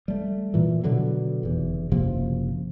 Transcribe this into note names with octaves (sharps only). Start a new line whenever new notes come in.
G3 A3
A#2 E3
B2 D3 F#3
F1 E2
F#1 C3 F3 A#3